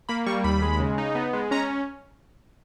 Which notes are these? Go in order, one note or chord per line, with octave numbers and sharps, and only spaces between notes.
A#3 B5
G3 C#6
D#2 B5
G#3
C#3
D#4
B3
G#3
C#4 A#5